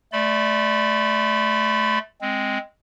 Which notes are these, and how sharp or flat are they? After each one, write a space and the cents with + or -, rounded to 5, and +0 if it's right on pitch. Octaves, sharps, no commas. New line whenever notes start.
A3 -20 D5 +0 B5 +30
G#3 +0 C4 +0